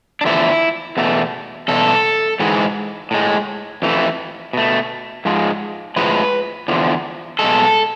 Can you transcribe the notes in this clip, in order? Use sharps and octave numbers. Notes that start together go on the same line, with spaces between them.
D4
E2 D3 F3 A3 E4
E2 B2 A3
E2 B2 A4
G#2 E3 G#3
A2 G#3
F2 E3 A3
B2 A3
G#2 F3 G#3
A2 F3 G#3 B4
E2 D3 F3
B2 G#3 A4